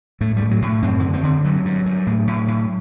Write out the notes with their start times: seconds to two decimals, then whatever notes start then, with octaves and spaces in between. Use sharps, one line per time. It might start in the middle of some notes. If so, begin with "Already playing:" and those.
0.21 A2 A3
0.37 A2 G3
0.51 F#3
0.62 A2
0.82 F#2 C4
1.03 D3
1.14 C4
1.23 D3
1.44 G2 F#3
1.65 G2
1.86 G2
2.07 A2
2.27 A2
2.48 A2